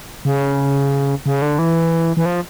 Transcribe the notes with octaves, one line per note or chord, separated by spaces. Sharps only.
C#3
C#3
D3
E3
E3
F3